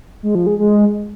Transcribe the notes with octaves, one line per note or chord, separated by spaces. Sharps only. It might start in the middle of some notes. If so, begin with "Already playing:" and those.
G#3
F3
G#3
G#3